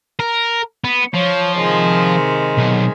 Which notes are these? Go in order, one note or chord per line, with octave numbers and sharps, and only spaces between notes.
A#4
B3
F3 C#5
C3 D#3 G#3
B1